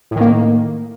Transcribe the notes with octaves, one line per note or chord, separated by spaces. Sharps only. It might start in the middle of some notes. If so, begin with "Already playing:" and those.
A2 D#3 A#3